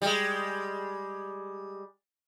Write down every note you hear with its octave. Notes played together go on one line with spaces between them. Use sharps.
G3 G#3